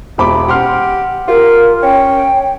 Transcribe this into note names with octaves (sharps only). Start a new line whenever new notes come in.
E1 C3 B5 D6
G4 F#5 C6 F6
F4 G4 A#4
C#4 G5